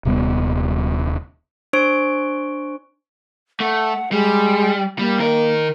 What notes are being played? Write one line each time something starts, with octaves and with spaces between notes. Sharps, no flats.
D#1 C3 G3 B3
D4 C5 C#6 D7
A3 F#5
G3 G#3
G3 A#3
D#3 A#4